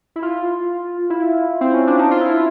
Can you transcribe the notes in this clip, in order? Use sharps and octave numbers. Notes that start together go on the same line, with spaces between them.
E4
F4
E4
C4
C#4
D4
D#4
F4
E4